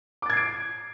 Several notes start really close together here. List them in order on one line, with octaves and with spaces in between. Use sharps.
D6 A6 G#6 C7 D7